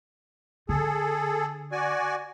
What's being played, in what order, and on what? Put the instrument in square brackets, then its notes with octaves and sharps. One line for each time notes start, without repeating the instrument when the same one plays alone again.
[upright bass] D3 [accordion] G#4 A4
[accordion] F#4 D5 G#5